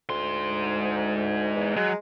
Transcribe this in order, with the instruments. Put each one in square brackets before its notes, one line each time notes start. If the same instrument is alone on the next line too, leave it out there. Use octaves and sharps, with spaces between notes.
[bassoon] D2 [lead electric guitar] G#2 C6
[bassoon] E2
[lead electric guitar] F#3 [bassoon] G#3